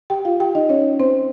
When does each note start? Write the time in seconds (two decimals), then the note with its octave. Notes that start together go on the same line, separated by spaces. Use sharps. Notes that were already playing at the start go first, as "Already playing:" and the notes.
0.10 G4 G5
0.25 F4 F5
0.40 G4 G5
0.55 D#4 D#5
0.69 C#4 C#5
1.00 C4 C5